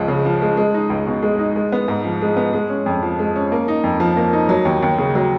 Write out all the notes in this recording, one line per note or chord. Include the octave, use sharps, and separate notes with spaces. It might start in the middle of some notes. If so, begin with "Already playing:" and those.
Already playing: C#2 F3 G#3
C#3
F3
G#3
G#3
D#4
C#2
B2
G#3
D#4
G#3
B3
G#2
F3
G#3
B3
G#3
C#4
F2
F3
G#3
C#4
A#3
D#4
F2
F3
A#3
D#4
F#3
D#2
D#2
C#3
F#3